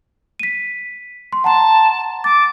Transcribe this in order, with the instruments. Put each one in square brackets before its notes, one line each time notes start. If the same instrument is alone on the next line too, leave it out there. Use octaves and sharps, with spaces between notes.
[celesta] B6 D#7
C6
[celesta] F#5 A#5 C6 [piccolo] A5
[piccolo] D6 [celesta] A6